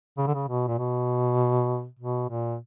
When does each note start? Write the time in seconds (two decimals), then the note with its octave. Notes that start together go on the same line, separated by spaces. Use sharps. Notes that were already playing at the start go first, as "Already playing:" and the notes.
0.18 C#3
0.27 D3
0.35 C#3
0.48 B2
0.68 A#2
0.78 B2
1.99 B2
2.29 A#2